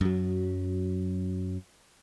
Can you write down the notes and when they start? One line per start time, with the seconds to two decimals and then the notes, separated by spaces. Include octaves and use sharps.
0.01 F#2 F#3